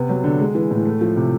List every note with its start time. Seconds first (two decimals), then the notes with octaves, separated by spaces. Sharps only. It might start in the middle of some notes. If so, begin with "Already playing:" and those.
Already playing: C3 B3
0.09 F#3
0.24 D3
0.39 G#3
0.55 E3
0.71 A2
0.85 A3
1.01 F3
1.16 C3